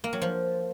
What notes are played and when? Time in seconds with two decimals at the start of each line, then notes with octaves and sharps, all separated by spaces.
0.04 A#3
0.13 F#3
0.22 F3